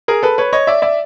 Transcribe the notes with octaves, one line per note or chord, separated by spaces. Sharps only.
G#4 A#4
A4 B4
B4 C#5
C#5 D#5
D5 E5
D5 E5